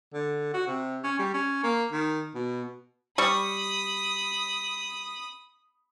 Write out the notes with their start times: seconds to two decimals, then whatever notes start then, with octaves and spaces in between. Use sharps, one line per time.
0.14 D3
0.54 F#4
0.67 C3
1.04 C#4
1.19 G3
1.34 C#4
1.63 A#3
1.92 D#3
2.35 B2
3.18 G3 B5 C#6 D#6